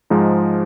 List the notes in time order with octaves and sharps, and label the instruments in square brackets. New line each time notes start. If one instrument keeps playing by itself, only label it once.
[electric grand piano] G#2 F3 G#3 D#4